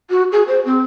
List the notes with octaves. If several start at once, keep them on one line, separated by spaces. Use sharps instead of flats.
F#4
G#4
C5
C4